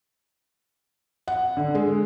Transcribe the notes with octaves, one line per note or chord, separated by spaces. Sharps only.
F#5
D3
G#3